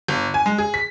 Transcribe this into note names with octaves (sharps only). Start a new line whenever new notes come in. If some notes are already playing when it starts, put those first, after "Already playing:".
G1
G#5
G#3
G#4
B6